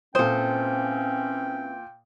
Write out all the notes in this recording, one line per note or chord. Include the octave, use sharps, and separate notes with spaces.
A#2 E3 C4 C#4 A4 C5 G5 D#6